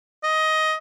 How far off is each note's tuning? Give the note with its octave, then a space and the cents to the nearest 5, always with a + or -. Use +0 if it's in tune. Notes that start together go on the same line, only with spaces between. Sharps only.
D#5 +15